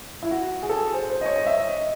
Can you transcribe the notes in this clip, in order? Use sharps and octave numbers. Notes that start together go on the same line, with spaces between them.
E4
F#4
G#4
A4
G#4
C5
C5
D#5
C#5
D#5
E5
D#5